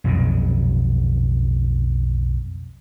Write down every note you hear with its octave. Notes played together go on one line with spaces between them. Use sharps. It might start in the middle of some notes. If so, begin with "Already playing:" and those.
B1 F2 A#2 C#3